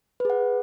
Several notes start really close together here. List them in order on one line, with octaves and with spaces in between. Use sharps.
B4 G#4 F#5